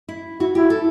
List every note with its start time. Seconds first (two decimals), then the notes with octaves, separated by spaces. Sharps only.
0.08 E4
0.40 E4 F#4
0.55 E4 G4
0.70 A4